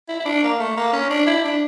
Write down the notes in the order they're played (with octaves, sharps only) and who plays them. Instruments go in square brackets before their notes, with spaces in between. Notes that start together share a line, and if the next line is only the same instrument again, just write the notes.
[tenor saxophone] E4
E4
D4
A#3
A3
A#3
C#4
D4
E4
D4